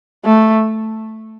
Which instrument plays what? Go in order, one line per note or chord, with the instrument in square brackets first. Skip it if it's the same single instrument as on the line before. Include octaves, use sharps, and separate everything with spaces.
[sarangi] A3